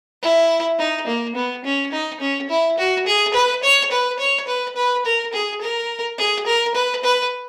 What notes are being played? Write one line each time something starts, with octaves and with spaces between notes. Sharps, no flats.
E4
D#4
A#3
B3
C#4
D#4
C#4
E4
F#4
G#4
B4
C#5
B4
C#5
B4
B4
A#4
G#4
A#4
G#4
A#4
B4
B4